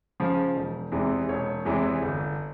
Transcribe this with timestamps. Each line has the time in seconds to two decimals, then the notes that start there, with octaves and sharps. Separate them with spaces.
0.20 C#3 F3
0.56 E1
0.92 E2 C3 E3 G#3
1.29 E1 C#5
1.65 E2 C3 E3 G#3
2.02 G1